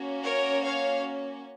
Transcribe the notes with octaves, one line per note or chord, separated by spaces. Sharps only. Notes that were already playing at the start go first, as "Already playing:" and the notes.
Already playing: A#3 C#4 F#4
A#4 C#5
C#5 F5